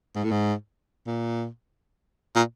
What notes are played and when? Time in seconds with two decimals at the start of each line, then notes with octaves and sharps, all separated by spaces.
0.15 G#2
0.24 A2
0.31 G#2
1.06 A#2
2.36 A#2